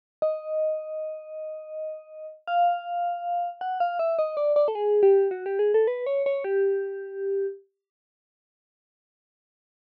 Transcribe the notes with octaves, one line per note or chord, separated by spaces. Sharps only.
D#5
F5
F#5
F5
E5
D#5
D5
D5
A4
G#4
G4
F#4
G4
G#4
A4
B4
C#5
C#5
G4